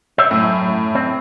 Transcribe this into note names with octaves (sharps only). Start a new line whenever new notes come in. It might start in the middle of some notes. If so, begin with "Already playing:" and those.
C5 C#5 E5
F#2 A2
C4